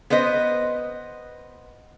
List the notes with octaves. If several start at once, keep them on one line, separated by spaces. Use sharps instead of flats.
B3 B4 C5 D#5